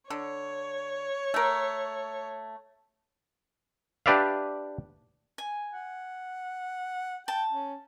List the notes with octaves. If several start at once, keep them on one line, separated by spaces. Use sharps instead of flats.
D3 C#5
A3 A#4
D4 G4 B4 D5 E5 F5
G#5
F#5
G5 A5
C#4